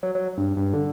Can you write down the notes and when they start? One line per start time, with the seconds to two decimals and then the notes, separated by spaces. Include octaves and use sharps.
0.03 F#3
0.15 F#3
0.38 G2
0.57 G2
0.74 D3